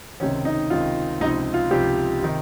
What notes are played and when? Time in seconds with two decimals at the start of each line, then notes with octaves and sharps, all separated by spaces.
0.20 C#2 C3 D#3 C#4
0.45 D#4
0.70 C#2 C3 D#3 F4
1.20 C#2 C3 F3 D#4
1.54 F4
1.71 C#2 C3 F3 G4
2.22 C3 D#3